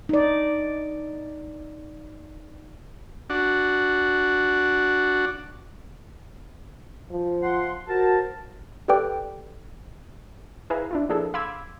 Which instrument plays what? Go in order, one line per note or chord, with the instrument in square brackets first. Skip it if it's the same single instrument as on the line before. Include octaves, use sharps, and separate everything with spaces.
[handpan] D#4 D5
[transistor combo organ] D4 F#4
[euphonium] F3
[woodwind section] F#5 C6
[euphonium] F#4 [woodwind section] A#4 C5 A5
[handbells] G4 A4 B4 D5 G5 D6
[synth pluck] E4 G#4 B4 F5 G#5 A#5
D4 E4 F4
F3 A#3 D4 E4 G#4 A4
F5 B5 C6 D6 E6 G#6